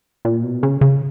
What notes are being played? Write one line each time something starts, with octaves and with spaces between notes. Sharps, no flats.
A#2
B2
C#3
C#3